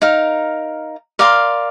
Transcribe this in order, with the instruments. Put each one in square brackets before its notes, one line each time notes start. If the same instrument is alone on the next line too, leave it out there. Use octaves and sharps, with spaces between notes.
[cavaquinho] D#4 A#4 F5
A#4 D5 F5 C6